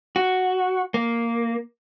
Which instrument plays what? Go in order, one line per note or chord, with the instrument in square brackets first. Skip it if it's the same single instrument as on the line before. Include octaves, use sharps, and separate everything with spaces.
[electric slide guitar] F#4
A#3